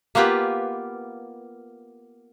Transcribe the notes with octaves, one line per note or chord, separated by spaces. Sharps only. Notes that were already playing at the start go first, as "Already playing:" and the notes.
A#3 B3 F4 G4 B4